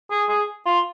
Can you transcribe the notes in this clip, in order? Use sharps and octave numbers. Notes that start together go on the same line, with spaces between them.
G#4
G#4
F4